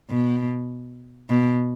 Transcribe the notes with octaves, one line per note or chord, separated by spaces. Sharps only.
B2
B2